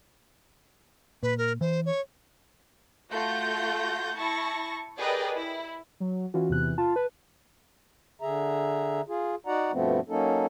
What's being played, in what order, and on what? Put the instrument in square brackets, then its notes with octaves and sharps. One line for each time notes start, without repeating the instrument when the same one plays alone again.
[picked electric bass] A#2 [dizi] B4
[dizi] A#4
[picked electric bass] E3 [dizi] C5
[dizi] C#5
[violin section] A3 F4 F#4 G6 A#6
E4 A5 C#6 A#6
G4 G#4 A#4 B4 D5 D#5
E4
[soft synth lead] F#3
[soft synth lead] E3 [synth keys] C#4 F4 F#4
[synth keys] E2 C3 F#6
[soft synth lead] F4 [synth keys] A5
[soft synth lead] B4
[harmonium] D3 G#4 E5 A#5
F4 G#4
D#4 F#4 D5 F#5 A#5
G2 B2 F3 A3 B3 C4
F#3 A#3 C#4 D#4 A4